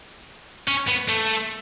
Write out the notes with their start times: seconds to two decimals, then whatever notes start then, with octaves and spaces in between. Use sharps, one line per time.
0.68 C#4
0.88 B3
1.09 A3